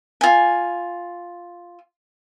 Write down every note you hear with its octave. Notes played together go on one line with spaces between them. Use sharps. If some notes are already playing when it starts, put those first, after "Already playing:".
F4 G#5